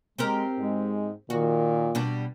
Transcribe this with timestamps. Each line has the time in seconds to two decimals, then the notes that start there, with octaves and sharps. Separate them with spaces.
0.18 G#3 C4 G4 A#4
0.58 G#2 G#3
1.30 A#2 D#3 F#4
1.95 B2 G3 D4